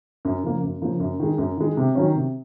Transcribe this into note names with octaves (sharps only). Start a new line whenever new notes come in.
F#2
C#3 F3 A#3
F#2
C#3 F3 A#3
F#2
D#3 G#3
F#2
D#3 G#3
C3
D#3 F#3 C#4
C3